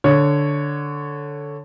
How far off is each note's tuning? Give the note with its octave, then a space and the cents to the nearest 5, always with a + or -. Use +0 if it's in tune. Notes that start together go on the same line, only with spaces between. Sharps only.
D3 +0 C#5 +0